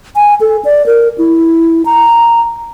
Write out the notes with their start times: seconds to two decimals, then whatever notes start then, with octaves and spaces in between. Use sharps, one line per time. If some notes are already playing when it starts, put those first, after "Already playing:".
0.16 G#5
0.41 A4
0.65 D5
0.86 A#4
1.18 E4
1.86 A#5